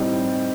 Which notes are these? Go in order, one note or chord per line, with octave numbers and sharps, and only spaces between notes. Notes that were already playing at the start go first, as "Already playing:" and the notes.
Already playing: A2 G3 C4 D#4